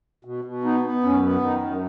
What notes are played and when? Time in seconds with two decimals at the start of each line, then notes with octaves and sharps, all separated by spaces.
0.25 B2
0.44 B2
0.64 B3 D#4
0.84 B3
1.04 F#2 C#4
1.23 B3
1.43 D#3 D#4
1.62 F#2